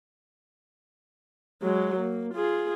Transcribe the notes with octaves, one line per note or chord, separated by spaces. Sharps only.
F#3 G#3
A#3
F4 G#4